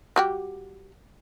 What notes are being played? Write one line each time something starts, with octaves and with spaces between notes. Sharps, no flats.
G3 F#4 G4